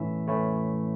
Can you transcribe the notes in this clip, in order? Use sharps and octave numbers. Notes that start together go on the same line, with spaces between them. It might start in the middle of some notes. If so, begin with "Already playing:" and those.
Already playing: A2 E3 A3 C#4 E4 E5
A2 E3 A3 C#4 E4